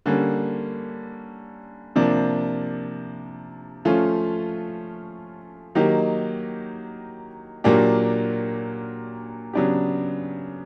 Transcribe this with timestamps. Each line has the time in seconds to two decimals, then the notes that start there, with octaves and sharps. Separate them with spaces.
0.06 D3 G3 A#3 C#4
1.96 C3 F3 A#3 D4
3.85 F3 A3 C#4 F4
5.75 D#3 F#3 A#3 D#4 G4
7.64 A#2 F#3 A#3 D4 G4
9.53 C#3 F#3 B3 D4 G4